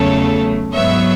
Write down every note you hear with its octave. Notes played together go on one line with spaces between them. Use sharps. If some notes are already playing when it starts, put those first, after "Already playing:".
Already playing: E2 C#3 F#3 A3 A4 C#5
G#2 F#3 B3 C#5 E5